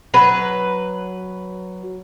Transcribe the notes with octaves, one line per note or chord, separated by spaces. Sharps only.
F#3 B4